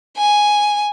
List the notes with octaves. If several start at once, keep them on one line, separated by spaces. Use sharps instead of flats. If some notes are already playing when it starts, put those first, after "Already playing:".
G#5